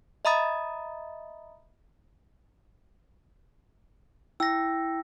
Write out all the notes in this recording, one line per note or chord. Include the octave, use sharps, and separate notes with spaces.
D#5 E5 A#5 B5 D#6 A6
E4 G5 E6 A#6